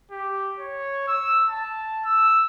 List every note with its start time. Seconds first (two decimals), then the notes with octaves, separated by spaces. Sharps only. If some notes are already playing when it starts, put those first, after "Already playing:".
0.11 G4
0.59 C#5
1.08 E6
1.49 A5
2.05 E6